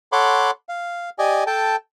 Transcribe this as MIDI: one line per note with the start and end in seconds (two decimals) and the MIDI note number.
0.12 0.51 69
0.12 0.51 73
0.12 0.51 78
0.12 0.51 83
0.12 0.51 84
0.12 0.51 86
0.69 1.10 77
1.19 1.44 67
1.19 1.44 74
1.19 1.44 75
1.19 1.44 80
1.47 1.76 69
1.47 1.76 79
1.47 1.76 81